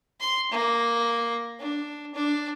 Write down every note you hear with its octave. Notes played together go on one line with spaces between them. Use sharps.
C6
A#3
D4
D4